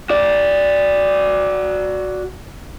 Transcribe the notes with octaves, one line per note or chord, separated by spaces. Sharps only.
F#4 D5